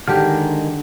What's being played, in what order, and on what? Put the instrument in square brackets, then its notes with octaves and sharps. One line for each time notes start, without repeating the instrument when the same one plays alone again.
[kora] D3 G4 [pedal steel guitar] D#3 G#3 F6